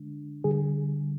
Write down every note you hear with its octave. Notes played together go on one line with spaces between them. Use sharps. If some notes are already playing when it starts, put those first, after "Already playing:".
Already playing: D3 G#3 D4
D3 G3 G#4